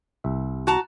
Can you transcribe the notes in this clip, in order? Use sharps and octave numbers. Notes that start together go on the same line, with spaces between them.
C2 E5
F#4 A5 A#5